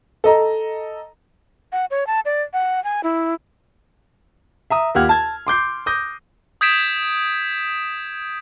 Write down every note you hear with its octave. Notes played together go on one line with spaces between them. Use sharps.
A4 D#5 A#5
F#5
C#5
A5
D5
F#5
G#5
E4
E5 A#5 D#6
D#2 F4 G4 F#5 F6 G#6
A5 G#6
C6 D6 G6 C7
D6 D#6 G6 A#6
D#6 G6 G#6 B6 D7 E7